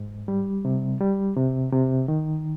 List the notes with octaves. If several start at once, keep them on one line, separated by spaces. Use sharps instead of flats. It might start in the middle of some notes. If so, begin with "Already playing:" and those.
Already playing: G#2
G3
C3
G3
C3
C3
D#3